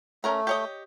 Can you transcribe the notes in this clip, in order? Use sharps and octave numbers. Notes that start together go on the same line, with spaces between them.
A3 C#4 A#4 A#5
G4 C#5 D#5